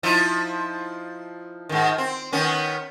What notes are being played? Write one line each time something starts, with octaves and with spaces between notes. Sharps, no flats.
F3 D#4 E4
G#2 D#3
C4
D#3 B3 C#4